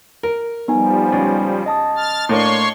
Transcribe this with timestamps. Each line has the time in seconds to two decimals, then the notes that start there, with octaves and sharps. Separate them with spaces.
0.23 A#4
0.68 F3 G3 B3 D#4 G#5
1.12 C#2
1.66 D#5 A5 D#6
1.96 F6 A6
2.29 A2 A#3 D4 C#5 C6 C#6